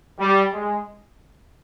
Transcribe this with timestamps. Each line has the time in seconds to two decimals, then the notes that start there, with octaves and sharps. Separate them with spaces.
0.19 G3
0.52 G#3